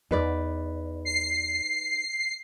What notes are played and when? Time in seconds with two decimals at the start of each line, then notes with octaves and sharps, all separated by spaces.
0.11 E2 D#4 B4 D5
1.05 C7